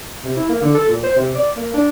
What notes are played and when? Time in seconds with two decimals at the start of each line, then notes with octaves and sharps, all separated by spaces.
0.24 C3
0.36 E4
0.49 A#3
0.61 D3
0.74 A4
0.88 A#2
1.03 C5
1.16 C3
1.35 D5
1.57 A#3
1.74 D4